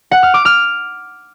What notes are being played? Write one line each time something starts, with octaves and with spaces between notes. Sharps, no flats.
F#5
F6
D6
F6